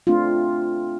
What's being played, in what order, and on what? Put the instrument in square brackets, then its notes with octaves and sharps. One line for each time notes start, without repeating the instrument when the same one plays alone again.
[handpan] A3 C4 D4 F4